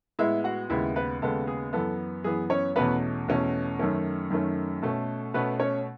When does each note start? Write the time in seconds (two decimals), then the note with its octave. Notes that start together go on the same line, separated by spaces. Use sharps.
0.19 A2 G#3 B3 E4 E5
0.44 F#4 F#5
0.70 D#2 C#3 G#3 B3 E4 E5
0.96 B3 B4
1.22 D#2 C#3 G#3 B3 A4
1.47 G#4
1.73 F#2 E3 B3 A4
2.24 F#2 E3 B3 G#4
2.50 C#4 C#5
2.76 E2 B2 A3 B3 C#4 B4
3.28 E2 B2 A3 C#4
3.79 F#2 D#3 A3 C#4
4.30 F#2 D#3 A3 C#4
4.82 B2 A3 C#4 A4
5.34 B2 A3 B3 C#4 B4
5.60 C#4 C#5